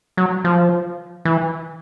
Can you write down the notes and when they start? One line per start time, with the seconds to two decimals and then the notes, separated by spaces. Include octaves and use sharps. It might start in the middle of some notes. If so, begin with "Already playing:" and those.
0.17 F#3
0.44 F3
1.25 E3